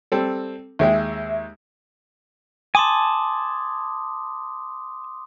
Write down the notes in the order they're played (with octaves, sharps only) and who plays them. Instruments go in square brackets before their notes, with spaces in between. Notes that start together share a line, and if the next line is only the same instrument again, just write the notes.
[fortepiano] G3 C4 A4
[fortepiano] D#2 G#3 G5 [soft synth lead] E5
[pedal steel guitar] G#5 A5 [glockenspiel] C6 D6 D#6